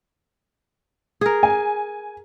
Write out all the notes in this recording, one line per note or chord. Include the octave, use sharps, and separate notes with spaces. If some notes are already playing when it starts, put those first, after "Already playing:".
G#4 A#4
G#5